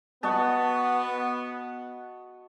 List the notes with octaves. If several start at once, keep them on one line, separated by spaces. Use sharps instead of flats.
B3 F#4 D#5 A5